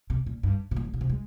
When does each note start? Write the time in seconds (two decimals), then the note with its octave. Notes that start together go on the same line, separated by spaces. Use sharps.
0.10 C3
0.26 A#2
0.43 G2
0.71 C3
0.76 A#2
0.84 G#2
0.94 A#2
1.01 C3
1.10 G#3